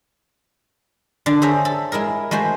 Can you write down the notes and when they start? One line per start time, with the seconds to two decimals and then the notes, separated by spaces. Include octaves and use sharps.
1.26 D3 D4
1.42 G#4 C5 C#5 E5 G#5 A#5
1.65 A4
1.92 G#3 E4 G#4 A#4
2.31 G#3 A3 F#4 C5